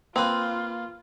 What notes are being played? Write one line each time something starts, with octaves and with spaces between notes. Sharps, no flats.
A#3 C4 F4 B4